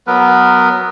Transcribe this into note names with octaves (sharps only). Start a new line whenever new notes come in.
F#3 B3 A#4 B4